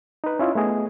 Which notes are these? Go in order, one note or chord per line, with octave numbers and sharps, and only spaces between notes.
D#4 B4
C#4 E4 F4 D#5
A3 B3 G#4 D#5